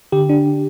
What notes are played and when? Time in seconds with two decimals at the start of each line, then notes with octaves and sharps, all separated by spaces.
0.12 D3 G4
0.29 D4